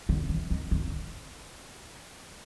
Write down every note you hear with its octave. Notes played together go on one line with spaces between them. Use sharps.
D3
E3
D#3
D3